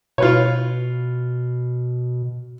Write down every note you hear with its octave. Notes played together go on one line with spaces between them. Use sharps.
B2 F4 B4 C#5